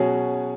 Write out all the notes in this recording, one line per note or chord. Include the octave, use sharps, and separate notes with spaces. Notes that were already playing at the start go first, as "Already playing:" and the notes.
Already playing: B2 F#3 C#4 G#4